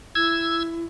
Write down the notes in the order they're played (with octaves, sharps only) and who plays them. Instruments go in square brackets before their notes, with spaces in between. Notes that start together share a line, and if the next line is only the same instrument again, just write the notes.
[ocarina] E4 [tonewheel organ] E6 G#6